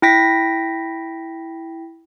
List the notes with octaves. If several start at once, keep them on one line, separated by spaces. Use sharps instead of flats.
E4 G5 A#6 B6